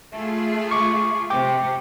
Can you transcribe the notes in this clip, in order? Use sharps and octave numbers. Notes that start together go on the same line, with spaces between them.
A3 F4 G#4
C#6 D6
C3 G5 D6